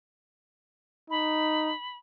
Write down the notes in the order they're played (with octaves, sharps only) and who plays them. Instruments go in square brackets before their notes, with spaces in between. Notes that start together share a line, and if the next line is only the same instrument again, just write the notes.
[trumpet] D#4 [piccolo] B5